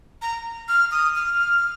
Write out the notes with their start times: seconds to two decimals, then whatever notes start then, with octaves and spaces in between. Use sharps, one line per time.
0.22 A#5
0.68 F6
0.92 D#6
1.16 F6